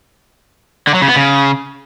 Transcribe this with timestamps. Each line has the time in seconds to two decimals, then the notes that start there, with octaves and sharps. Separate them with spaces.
0.87 D3
0.94 F#3
1.02 C#3
1.09 B3
1.16 C#3